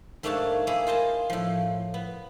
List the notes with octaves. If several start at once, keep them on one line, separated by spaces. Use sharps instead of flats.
G#2 A3 A#3 D4 C#5 A5
A#3 E4 F4 G#4
F4 C5 D#5 A5
A2 F3
B3